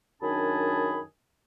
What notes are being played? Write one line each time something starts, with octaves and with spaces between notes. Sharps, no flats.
F#2 D#3 D4 G#4 A5 B5